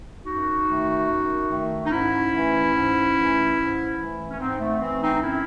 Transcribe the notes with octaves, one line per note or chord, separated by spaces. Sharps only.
F#2 D#4 F#4
D#3 A3
F#2
D#3 A3
D#4
G#2 C#4 E4
E3 A3
G#2
E3 A3
G#2
E3 A3
C#4
G#2 C4 D#4
A3
E3 A3 C4
C4 D#4
D#4
F#2 C#4 E4